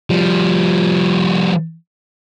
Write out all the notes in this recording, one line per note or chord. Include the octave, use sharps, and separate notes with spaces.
F3 G3